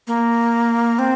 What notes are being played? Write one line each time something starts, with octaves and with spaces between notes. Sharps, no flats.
A#3
C4